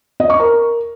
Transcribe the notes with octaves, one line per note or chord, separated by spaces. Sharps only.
D#5
C#6
A#4